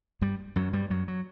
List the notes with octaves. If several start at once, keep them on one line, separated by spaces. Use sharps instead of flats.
G2 G3
F#2 F#3
G2 G3
F#2 F#3
F#3